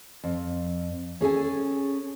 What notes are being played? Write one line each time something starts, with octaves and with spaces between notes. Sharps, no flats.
F2
C#4 G#4 A4 G#5